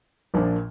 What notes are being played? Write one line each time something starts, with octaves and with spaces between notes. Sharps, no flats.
A#1 A#2 F3 A#3 D4